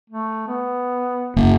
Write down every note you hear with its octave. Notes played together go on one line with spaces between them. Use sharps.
A3
B3
F#1 A#3